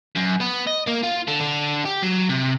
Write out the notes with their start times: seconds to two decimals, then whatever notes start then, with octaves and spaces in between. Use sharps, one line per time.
0.15 F#2
0.40 B3
0.67 D#5
0.87 A#3
1.03 F4
1.27 D3
1.41 D3
1.86 G4
2.03 F#3
2.30 C3